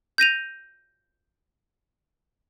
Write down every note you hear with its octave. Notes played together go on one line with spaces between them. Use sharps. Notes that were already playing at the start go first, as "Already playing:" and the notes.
G6 A#6 D#7 F7